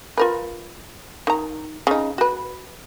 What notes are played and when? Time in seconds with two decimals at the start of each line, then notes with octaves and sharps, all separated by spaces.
0.17 F4 A#4 B4
1.27 D#3 A#5
1.87 C#3 D#4
2.18 F#4 B4